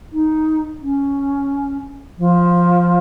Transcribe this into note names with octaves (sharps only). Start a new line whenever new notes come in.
D#4
C#4
F3